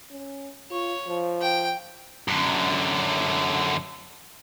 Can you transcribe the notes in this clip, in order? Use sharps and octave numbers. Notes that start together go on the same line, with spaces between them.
C#4
F4 C#5
F3
G5
F#2 D3